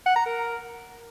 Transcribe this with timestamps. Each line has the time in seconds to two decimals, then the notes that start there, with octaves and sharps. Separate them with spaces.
0.06 F#5
0.16 A#5
0.26 A#4